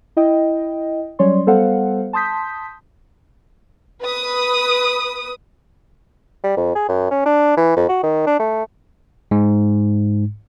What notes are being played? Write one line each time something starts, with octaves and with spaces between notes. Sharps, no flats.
E4 D#5 G5
F#3 G3 C#4 C#5 D5 C6
G3 B3 A4 C5 F5 F#5
A5 C6 D#6 G6 B6
B4 D#6
G3
F2
G#4
F#2
C#4
D4
E3
F2
F#4
D#3
D4
A3
G#2